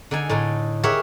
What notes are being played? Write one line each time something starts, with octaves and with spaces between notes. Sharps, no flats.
D3 D#4 G#5
A2 D3 D#4
G4 G#4 A#4 C#5 E5 F#5